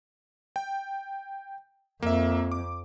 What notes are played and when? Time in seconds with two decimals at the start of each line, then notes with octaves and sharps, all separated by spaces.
0.56 G5
2.02 F2 A#3 E5
2.52 D6